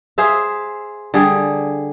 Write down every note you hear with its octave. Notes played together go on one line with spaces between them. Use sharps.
G#4 C5 E5 F5
D3 G3 G#4